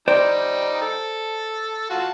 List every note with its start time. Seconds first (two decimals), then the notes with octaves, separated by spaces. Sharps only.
0.08 G3 D#4 C5 D5 G5
0.82 A4
1.90 F4 F#4 A5